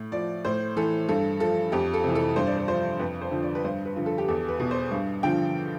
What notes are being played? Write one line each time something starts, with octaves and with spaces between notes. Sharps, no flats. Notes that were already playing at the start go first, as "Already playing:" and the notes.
Already playing: A2
F3 D5
A2 C5
E3 A4
G2 A4
F3 A4
F2 G4
A4
C3 E3
A4
G2 C5
D5
C5
F3 C5
F2 B4
C5
D3 F3
D5
B4
G2 C5
B4
D3 F3
A4
G4
E2 A4
B4
B2
C5
G2
D3 F3 G5